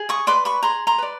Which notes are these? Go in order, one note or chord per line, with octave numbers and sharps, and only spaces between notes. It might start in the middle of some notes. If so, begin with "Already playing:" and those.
Already playing: G#4
C#6 D#6
B4 D5 C6 D6
B5 C#6
G#4 A#5 C6
A#5 C6
B4 D5